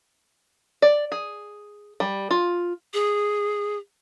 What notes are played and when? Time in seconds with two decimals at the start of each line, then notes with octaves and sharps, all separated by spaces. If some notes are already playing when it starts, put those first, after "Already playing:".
0.82 D5
1.12 G#4
2.00 G3
2.31 F4
2.94 G#4